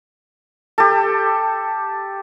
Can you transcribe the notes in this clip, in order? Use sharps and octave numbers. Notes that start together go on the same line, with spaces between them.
G4 A4